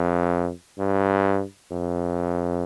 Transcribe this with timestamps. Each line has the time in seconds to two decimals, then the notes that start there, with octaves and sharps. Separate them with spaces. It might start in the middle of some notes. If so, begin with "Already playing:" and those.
Already playing: F2
0.79 G2
1.71 F2